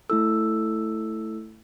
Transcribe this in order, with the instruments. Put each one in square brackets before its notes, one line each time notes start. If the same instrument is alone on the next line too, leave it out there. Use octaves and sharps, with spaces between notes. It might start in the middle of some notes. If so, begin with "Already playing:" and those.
[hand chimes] A3 E4 A4 E6